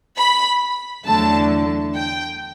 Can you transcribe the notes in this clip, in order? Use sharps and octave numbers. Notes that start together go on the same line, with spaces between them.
B5
E2 D3 F#3 A3 A5
G5